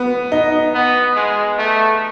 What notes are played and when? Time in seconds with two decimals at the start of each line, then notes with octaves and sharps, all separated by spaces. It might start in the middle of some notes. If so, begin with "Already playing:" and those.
Already playing: B3
0.32 D#4
0.74 B3
1.16 G#3
1.58 A3